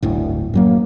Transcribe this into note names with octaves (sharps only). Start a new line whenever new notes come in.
D1 G1 D2 A2
F#2 F#3 A#3